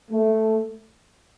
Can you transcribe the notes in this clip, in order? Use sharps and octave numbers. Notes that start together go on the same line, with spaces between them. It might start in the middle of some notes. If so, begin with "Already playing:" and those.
A3